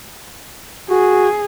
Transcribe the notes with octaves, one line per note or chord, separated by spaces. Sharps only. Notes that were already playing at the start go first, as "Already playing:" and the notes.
F#4 G#4